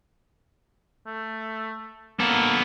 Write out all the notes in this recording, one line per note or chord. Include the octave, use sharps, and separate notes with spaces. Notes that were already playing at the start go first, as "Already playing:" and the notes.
A3
A#3 B3 A4